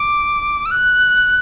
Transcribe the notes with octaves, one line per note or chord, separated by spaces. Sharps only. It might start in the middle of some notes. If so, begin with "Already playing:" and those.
Already playing: D6
E6
F#6